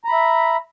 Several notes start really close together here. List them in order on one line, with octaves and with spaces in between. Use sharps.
A#5 B5 E5